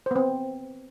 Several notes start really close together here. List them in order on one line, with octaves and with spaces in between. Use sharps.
C5 B3 C4